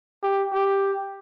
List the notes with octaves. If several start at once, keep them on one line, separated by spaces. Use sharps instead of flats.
G4
G4